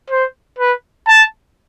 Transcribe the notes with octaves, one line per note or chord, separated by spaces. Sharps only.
C5
B4
A5